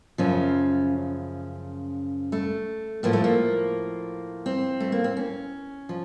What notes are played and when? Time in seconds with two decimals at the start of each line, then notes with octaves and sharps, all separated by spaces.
0.18 F#2 C#3 F3 C#4
2.32 A3
3.03 A2 F3 A#3
3.13 A3
3.24 A#3
4.46 C4
4.80 A3
4.92 A#3
5.04 C4
5.17 C#4
5.89 F3